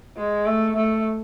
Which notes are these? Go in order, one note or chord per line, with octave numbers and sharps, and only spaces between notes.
G#3
A3
A3